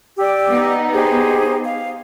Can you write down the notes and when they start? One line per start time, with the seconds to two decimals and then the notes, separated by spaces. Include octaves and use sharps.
0.18 G4 D5 E6
0.50 B3 D#4
0.94 G4 G#4 C5
1.65 F5